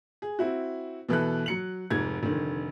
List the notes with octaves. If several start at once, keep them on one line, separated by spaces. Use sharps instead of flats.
G#4
C4 E4 F#4
B2 E3 A4 F#6
F#3 C#7 F#7
F1 G#2 G#6
F1 D3 D#3